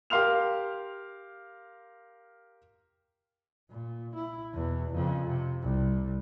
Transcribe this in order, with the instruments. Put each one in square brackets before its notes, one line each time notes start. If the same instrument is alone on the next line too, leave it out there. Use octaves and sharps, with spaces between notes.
[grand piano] G4 A#4 F5 C6 F6 F7
[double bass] A#2
E4
E2 B2
F2 C#3
C3
C2